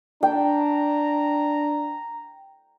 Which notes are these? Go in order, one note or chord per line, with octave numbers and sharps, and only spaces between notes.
D4 G5 A#5